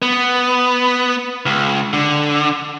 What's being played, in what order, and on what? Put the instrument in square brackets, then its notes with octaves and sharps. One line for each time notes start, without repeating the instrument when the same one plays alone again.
[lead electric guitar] B3
C#2
D3